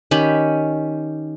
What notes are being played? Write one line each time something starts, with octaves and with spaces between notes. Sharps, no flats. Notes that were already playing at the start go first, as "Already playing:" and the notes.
D#3 C#4 G4 B5